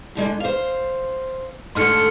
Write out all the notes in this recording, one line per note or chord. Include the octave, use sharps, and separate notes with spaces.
A2 D3 G#3
C5 F5
G#2 D3 A3 C6 F6 C#7